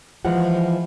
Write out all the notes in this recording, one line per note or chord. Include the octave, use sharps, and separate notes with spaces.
E3 F3 G#3 F#5